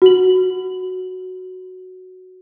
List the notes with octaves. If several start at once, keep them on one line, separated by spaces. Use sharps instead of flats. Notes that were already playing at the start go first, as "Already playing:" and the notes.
F#4 F#7